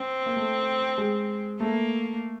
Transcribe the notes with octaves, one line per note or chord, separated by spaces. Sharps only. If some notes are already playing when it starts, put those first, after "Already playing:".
Already playing: C4
A#3
A3
G#3
A3 A#3